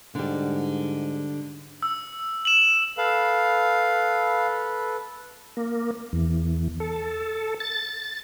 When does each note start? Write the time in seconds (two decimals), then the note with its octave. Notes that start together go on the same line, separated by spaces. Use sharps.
0.15 G#2 D3 G3
1.83 E6
2.45 E7 F#7
2.98 A4 B4 F5
5.57 A#3
6.13 E2
6.80 A4
7.60 A6